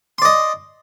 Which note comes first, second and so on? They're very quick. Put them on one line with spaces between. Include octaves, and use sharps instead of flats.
C6 D5 D#5